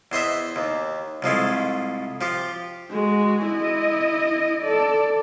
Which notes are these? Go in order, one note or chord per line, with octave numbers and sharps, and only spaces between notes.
E2 C5 D#5 E5
D#2
C2 F3 G#3 A3
F3 G4
G#3 F#4
E4 D#5
A4 D5